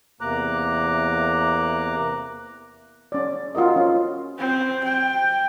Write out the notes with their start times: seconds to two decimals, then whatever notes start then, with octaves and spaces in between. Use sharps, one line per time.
0.21 E2 C3 A#3 A#5 D6 F#6
3.12 C#4 D5
3.55 F4 F#4 A#4 D#5
3.76 C#4
4.38 C4
4.84 G5